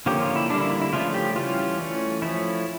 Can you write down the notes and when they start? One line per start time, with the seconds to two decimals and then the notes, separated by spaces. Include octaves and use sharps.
0.06 D3 F3 A#3 C#4 G4
0.21 F4
0.36 E4
0.50 D3 G3 A#3 D4
0.61 E4
0.71 E4
0.81 E4
0.93 C#3 F3 A3 C#4 F4
1.14 G4
1.36 E3 G3 C#4 F4
1.79 E3 A3 C#4
2.22 F3 A3 C#4 E4